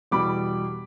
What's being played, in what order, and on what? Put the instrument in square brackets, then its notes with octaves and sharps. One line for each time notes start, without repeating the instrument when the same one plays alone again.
[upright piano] E2 B2 G3 B5 D6